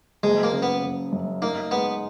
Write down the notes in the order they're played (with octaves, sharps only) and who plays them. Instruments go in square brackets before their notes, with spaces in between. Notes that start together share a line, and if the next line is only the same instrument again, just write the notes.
[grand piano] F#1 [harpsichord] G#3
[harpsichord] A#3
[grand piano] C#3
[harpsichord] B3
[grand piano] F#1
F#2
[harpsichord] A#3 [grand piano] D#4
[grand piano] G#3 [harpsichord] B3